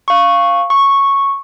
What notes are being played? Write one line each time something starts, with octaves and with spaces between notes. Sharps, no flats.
F5 C#6
C#6